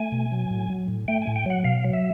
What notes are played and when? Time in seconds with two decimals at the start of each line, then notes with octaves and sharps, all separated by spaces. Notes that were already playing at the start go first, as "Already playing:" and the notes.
Already playing: A3 G#5
0.12 B2
0.32 F#3
0.51 A2
0.70 F#3
0.88 A2
1.08 A3 G5
1.22 G#5
1.27 A2
1.36 G5
1.46 F#3 F#5
1.64 B2 F5
1.84 F#3
1.93 E5